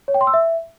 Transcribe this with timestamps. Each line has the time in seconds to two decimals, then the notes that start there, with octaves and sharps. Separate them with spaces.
0.08 C#5
0.14 G5
0.21 C6
0.27 E6
0.34 E5